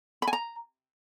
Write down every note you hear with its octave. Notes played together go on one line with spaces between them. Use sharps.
B5
G#5
A#5